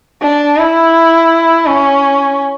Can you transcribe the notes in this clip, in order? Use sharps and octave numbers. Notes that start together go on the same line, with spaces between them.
D4
E4
C#4